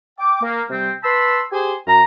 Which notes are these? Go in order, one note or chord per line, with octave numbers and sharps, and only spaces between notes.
G5 D6
A#3
C3 G3 C4 G5
B4 A5 B5 C6 E6
G4 G#4 C5 G#5
F#2 F#4 A#5